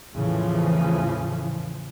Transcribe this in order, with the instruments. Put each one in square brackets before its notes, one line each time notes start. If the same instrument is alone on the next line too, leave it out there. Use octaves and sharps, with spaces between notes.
[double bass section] E2 A2 C#3 E3 F3